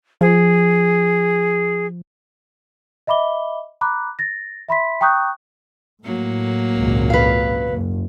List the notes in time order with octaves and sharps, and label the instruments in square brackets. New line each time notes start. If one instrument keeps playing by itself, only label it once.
[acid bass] F3 [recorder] G#4
[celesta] D#5 E5 B5 D6 G7
A#5 B5 D6 F#6
A6 A#6
E5 B5 C6 B6
G5 A#5 C#6 D#6 F#6 G6
[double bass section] A2 [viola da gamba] F#3 A#3
[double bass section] G#1 C#2 A#2
[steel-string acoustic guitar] B4 F5
[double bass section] F#1